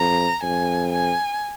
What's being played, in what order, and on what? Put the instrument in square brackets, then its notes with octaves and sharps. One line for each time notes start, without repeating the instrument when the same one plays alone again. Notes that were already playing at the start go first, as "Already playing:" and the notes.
Already playing: [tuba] F2 [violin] A#5
[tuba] F2 [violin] G#5
[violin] G#5